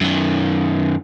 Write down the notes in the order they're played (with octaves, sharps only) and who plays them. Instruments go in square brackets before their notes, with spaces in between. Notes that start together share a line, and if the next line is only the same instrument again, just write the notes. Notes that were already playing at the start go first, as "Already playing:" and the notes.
[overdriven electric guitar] F#2 D#3